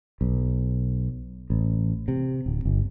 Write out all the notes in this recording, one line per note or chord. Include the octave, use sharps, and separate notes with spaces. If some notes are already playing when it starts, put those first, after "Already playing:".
B1
A1
C3
D1
G1